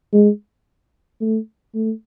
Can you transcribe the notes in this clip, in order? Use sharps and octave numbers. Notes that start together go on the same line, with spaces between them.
G#3
A3
A3